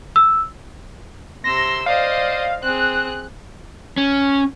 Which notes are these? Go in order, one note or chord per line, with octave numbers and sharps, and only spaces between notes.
E6
C3 C6 E6 A#6
C5 D5 D#5 F5
C4 G#4 F#6
C#4